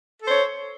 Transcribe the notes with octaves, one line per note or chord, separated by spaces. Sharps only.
A4 C5 C#5